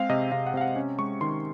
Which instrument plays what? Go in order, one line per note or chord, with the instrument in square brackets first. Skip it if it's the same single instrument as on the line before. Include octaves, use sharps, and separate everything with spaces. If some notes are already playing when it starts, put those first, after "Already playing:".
Already playing: [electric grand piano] G#3 C4 F5
C3 D#5
C3 F5
F#5
C3 F5
F#5
C#4
G#3 C#6
D#3 C6